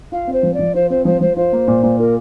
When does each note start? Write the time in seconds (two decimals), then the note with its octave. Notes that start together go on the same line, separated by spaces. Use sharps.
0.12 F4 F5
0.27 C4
0.33 C5
0.43 F3
0.54 D5
0.59 F3
0.75 F4 C5
0.90 C4 C5
1.05 F3 C5
1.21 F3 C5
1.37 F4 C5
1.52 A#3
1.68 A#2
1.83 A#2
1.99 F4 A#4